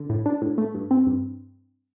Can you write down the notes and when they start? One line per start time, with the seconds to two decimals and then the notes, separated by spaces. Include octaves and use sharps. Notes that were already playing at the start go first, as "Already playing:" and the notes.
Already playing: D3
0.09 A2
0.26 D4
0.42 A2
0.58 A3
0.75 G2
0.91 C4
1.06 G2